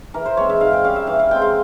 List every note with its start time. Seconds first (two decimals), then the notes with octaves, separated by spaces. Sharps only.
0.14 E3 A#4
0.26 C5
0.37 G#3 C4 C#5
0.50 E5
0.60 G#2 F5
0.73 G5
0.84 G3 C#4 F5
0.96 E5
1.07 E3 F5
1.19 F5
1.31 G#3 C4 G5
1.42 F5